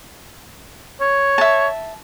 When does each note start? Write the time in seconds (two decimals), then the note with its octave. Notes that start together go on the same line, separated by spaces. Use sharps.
1.01 C#5
1.38 E5 A5